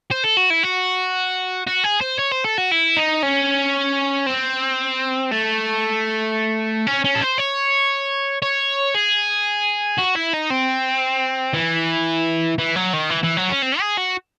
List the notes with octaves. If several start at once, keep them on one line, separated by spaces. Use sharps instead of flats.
C5
A4
F#4
E4
F#4
F#4
G#4
C5
C#5
C5
A4
F#4
E4
D#4
C#4
C4
A3
C#4
C#4
A4
C5
C#5
C#5
G#4
F#4
E4
D#4
C4
E3
E3
F#3
D#3
E3
E3
F#3
C#4
C4
G#4
F#4